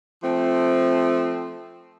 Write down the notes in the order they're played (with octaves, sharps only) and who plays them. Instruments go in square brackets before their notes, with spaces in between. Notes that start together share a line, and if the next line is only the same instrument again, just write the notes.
[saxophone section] F3 A3 C4